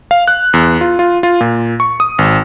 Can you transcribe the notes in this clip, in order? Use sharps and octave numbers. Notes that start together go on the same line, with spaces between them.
F5
F#6
E2
F4
F4
F4
A#2
C#6
D#6
G#1